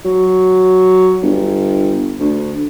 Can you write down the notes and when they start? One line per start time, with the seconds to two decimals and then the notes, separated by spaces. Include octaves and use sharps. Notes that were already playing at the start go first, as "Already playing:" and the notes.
0.05 F#3
1.23 G1
2.20 D2